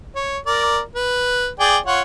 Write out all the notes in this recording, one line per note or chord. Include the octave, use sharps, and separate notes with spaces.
C#5
A#4 D5
B4
G#4 D5 G5
F4 C#5 F#5